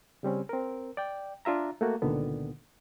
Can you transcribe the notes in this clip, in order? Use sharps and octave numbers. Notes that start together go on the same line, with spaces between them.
C#3 G3 C4 C#4
C4 A#4
D5 G5
D4 F4 E5 A#5
A3 A#3 F#4
C#2 A#2 D3 D#3 B3